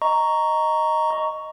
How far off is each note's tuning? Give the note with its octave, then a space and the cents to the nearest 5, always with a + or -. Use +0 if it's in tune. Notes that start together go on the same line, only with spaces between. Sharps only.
D#5 +0 A#5 +0 C#6 +10